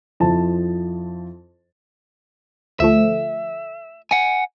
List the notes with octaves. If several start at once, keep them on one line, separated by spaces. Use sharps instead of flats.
F2 F3 E4 A5
D2 F3 A3 E5
F#5 G#5